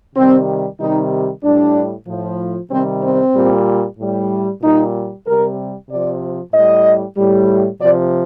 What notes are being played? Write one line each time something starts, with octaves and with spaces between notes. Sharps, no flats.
C3 D#3 G3 C4
C3 D#3 G3 D#4
A2 G3 D4
A2 F3
C3 D#3 G3 C4
C4
A#2 G3
A2 G3
A#2 G3 D#4
C3 G3 A#4
C3 F3 D5
A2 G3 D#5
A2 G3
C3 F3 D5